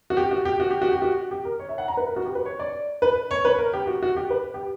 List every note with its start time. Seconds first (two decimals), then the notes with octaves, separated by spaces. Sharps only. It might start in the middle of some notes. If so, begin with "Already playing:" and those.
0.10 F#4
0.17 G4
0.31 F#4
0.45 G4
0.60 F#4
0.71 G4
0.82 F#4
0.92 G4
1.02 F#4
1.31 G4
1.45 A#4
1.59 C#5
1.69 E5
1.78 F#5
1.88 A#5
1.97 B4
2.08 A#4
2.16 F#4
2.26 G4
2.35 B4
2.45 C#5
2.60 D5
3.02 B4
3.31 C#5
3.45 B4
3.59 A#4
3.73 G4
3.87 F#4
4.03 F#4
4.17 G4
4.30 B4
4.54 G4